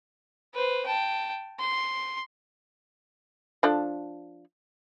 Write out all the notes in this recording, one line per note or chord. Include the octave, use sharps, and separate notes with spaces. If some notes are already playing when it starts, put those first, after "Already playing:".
B4 C5
G5 A5
C6
F3 D4 A4